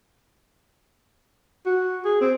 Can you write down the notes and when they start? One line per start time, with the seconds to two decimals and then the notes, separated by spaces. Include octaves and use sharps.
1.66 F#4
2.05 G#4
2.21 C4